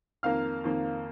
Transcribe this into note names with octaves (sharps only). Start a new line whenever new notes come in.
F2 D#3 A#3 F5 F6
F2 D#3 A#3